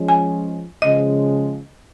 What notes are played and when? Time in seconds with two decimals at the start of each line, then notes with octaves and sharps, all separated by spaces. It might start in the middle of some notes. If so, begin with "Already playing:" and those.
Already playing: F3 G#3 C#4
0.08 G#5
0.82 C#3 F3 G#3 D#5